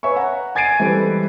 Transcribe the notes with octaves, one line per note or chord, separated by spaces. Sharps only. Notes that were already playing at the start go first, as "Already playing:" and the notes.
B4 C#5 E5 G#5 C#6
F#5 A#5
G#5 G#6 A6 C7 D7 D#7
E3 G3 G#3 C4 A4 B4